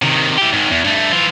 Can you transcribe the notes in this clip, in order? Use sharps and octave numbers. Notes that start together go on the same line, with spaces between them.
C3 D#3
E3 G4
G#2 D#3
E2
G2 A3
E3 F4